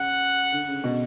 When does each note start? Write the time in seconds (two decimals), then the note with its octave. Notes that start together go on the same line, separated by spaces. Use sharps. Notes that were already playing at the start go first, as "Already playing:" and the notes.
Already playing: C#3 F#5
0.53 D3
0.67 C#3
0.84 B2